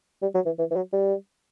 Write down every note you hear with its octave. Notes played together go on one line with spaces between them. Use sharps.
G3
F#3
E3
E3
E3
F#3
G3